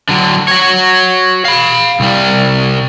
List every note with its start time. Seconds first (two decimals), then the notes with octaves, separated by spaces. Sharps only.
0.09 D3 F#3
0.48 F#4 C#5
1.45 F5 B5
2.00 C2 G3